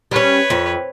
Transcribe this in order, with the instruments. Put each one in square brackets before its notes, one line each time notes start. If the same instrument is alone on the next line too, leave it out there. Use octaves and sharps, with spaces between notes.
[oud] G3 C#4 [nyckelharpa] B4 C#5
[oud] F2